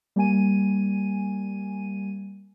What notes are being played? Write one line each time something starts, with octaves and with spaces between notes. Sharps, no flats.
G3 A#3 G#5 D#7